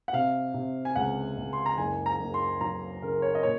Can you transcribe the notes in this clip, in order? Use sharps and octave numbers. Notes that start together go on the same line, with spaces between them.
F#5
C3 F5
C3
G#5
C#2 F#5
C#2
C6
A#5
F#1 G#5
A#5
F#1
C6
F#3 A#5
C#3 A#4
C#5
D#5
A#2 C#5